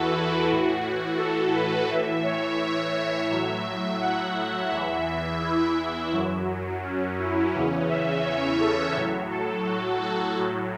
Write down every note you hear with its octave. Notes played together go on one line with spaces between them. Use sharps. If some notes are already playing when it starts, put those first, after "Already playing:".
Already playing: E2 E3 F#4 A4 B4
E4
A2 E3 F#4
A4
B4
A2 E3 E5
C#5
A2 F#3 E5
F#5
E2 E3 E5
E4
F#2 F#3
C#4
E4
E2 C#3 E3 C#4
E5
C#5
A4
A2 F#3
A4
F#4
A4
A2 F#3